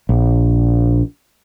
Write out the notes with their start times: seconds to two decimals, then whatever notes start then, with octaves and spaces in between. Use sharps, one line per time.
0.09 A#1